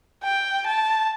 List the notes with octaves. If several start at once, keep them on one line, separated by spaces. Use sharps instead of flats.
G5
A5